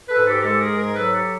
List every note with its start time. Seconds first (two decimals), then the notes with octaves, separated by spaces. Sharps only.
0.09 A4 B4
0.17 G#2
0.26 G4 A4
0.39 A#4
0.43 G#3 G4 A4
0.61 G#4 A#4
0.69 G#2
0.78 G#4 A#4
0.96 F#3 A4 B4
1.14 G4 A4